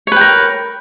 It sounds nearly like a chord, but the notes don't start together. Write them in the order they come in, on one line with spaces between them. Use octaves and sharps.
C#5 B4 G5 A#4